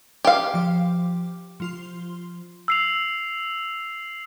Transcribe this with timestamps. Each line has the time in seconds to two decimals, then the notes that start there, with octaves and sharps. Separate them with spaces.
0.25 G4 F5
0.54 F3 D6
1.60 F3 F4 C6
2.68 E6 C7 F7